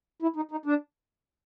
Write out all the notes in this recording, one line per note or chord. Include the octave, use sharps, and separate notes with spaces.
E4
D#4
D#4
D4